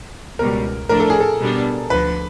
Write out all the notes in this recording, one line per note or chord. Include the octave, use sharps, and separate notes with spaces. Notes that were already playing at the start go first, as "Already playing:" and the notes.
C#2 B2 G3 A#4
A2 F3 A3 D4 A#4
A4
G#4
A4
B2 G3 B3 D4
D2 D3 F3 B4